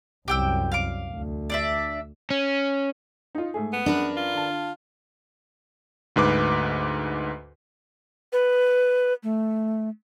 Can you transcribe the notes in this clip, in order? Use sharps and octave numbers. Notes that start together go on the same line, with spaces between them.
C2 F#2 G4 G5 E6
F5 D6
D2
D4 D5 E5
C#4
D#4 F4
G#2 A3 G#4
B3
F#2 D4 A#4 B4
F4
D3 A5
D2 G#2 B4 D6
B4
A3